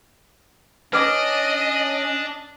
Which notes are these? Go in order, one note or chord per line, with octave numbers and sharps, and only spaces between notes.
C#4 D4 B4 D#5 D6